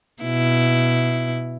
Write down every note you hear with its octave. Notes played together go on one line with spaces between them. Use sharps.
B2 E4